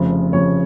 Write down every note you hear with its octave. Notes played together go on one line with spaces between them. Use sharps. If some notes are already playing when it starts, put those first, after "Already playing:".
Already playing: F1 F2 C#3 F3
F1 F2 C#3 F3 C#5